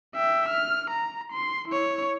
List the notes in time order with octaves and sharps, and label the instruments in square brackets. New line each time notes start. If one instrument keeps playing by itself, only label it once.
[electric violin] E5 G5
F6
A#5
C6
E4 C#5